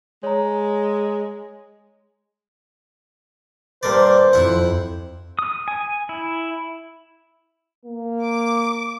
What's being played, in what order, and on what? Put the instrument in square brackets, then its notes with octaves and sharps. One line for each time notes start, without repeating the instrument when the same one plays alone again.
[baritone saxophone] G#3 [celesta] C#5 A#5
[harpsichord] G2 A#3 D5 [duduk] C5
[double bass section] F2 [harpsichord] E4 F#5
[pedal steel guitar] D#6
G#5
E4
[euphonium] A#3
[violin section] D6